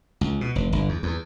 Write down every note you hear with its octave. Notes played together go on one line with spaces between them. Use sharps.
C#2
B2
F1
G1
E2
E2